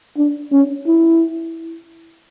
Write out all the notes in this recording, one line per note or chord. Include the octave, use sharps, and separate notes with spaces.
D4
C#4
E4